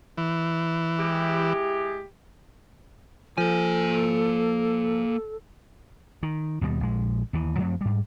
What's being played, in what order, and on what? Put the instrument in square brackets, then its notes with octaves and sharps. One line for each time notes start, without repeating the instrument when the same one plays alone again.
[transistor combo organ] E3
[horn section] G#3 E4 G4
[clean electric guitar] F3 [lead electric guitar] A#3 G#5 [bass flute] A4
[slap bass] D#3
D#2 B2 F3 G3
A#1 G#3
D#2 E3
F#2 F3 A3 C4
G#2 G3